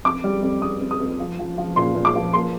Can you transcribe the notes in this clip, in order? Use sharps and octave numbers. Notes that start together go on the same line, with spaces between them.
F2 D6
G3
F2
F2 D#6
F2
D#6
F2
F3
F3
F3
A#2 C6
A#2
D6
F3
A#3 C6